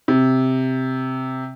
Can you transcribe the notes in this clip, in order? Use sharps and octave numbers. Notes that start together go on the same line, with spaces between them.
C3